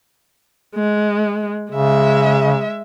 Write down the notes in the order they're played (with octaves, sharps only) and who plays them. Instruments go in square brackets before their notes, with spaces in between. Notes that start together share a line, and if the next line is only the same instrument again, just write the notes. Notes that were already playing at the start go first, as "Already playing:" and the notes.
[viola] G#3
[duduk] C#3 [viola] G#3 E5